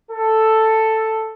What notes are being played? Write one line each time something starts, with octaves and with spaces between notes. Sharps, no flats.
A4